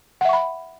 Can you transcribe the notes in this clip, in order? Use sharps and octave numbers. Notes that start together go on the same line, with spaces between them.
E5 F#5 B5 C#6